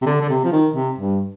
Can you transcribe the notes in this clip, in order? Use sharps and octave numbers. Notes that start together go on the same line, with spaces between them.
C3
D3
D3
C3
F3
D#3
C3
G2